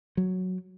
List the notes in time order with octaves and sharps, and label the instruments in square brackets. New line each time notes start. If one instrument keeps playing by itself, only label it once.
[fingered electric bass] F#3